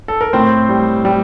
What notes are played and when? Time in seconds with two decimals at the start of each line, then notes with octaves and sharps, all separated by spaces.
0.08 A4
0.21 A#4
0.33 A2 C4 C5
0.69 G3
1.05 G3